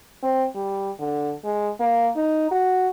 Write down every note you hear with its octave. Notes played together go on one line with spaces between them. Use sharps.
C4
G3
D3
G#3
A#3
D#4
F#4